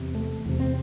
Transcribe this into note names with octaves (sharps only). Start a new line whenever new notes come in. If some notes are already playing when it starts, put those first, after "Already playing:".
Already playing: E2 C3
A3
E2 C3
C4